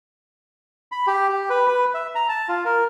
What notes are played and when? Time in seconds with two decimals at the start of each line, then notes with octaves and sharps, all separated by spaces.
0.92 B5
1.07 G4
1.29 G4
1.50 B4
1.68 B4
1.94 E5
2.15 A#5
2.29 A5
2.49 F4
2.65 A#4